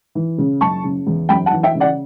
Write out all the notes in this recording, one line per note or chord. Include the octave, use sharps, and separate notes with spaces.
E3
C#3
F#1 A5 C#6
C#3
E2
F#2 G5 B5
F#5 A5
E3
E5 G5
C#3
D5 F#5